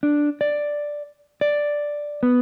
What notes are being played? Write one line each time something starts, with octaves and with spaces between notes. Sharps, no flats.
D4
D5
D5
B3